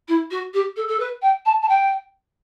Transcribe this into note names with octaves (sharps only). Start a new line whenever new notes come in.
E4
F#4
G4
A4
A4
B4
G5
A5
A5
G5